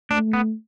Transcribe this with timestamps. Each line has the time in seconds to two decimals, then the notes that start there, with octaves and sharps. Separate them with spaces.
0.11 A3 D4
0.33 B3